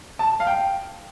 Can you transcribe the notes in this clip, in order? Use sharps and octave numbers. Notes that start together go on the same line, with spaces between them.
A5
F5
G5